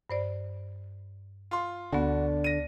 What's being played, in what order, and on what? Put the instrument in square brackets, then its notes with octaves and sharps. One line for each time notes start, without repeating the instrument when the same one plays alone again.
[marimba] G2 C5 D5
[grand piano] F4 C6
[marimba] D2 B3 [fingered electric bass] D3 [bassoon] D4 [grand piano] F#4
[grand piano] A#6 D#7